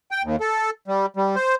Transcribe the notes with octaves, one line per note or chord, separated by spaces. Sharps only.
G5
D#2
A4
G3
G3
C5